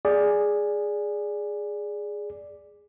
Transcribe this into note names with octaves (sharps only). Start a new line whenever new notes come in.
G#4 D5